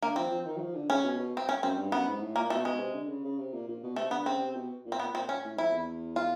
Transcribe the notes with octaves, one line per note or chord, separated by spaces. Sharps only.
D3 A#3
F3 C4
F3
D#3
F#3
F3
D3
C#3 C#4
B2
B2
C4
C#4
F#2 C4
G2
F#2 B3
G#2
A2
A#2 A#3
B2 A3
B2 G#3
C3
D3
C#3
C#3
C3
A#2
A#2
B2
C3 A3
D3 B3
C#3 C4
C3
B2
A#2
C4
A#2 B3
A#2 C4
C#4
A2
F2 E4
E2
F4